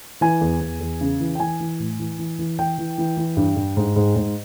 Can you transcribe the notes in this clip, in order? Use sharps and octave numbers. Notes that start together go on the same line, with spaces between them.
E3 G#5
E2
E2
E2
C#3
E3
G5
E3 G#5
E3
A2
E3
E3
E3
E3 G5
E3
E3
E3
G2
G2
G#2
G#2
G#2